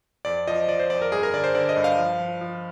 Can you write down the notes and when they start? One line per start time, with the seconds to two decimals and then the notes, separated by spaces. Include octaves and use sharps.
0.25 F2 D5
0.48 F3 D#5
0.68 F3 D5
0.79 C5
0.90 F2 D5
1.02 A#4
1.12 G2 G#4
1.23 A#4
1.34 D3 D5
1.44 C5
1.55 D3 D5
1.69 D#5
1.77 G2
1.84 F5
1.98 F3
2.20 F3
2.41 F3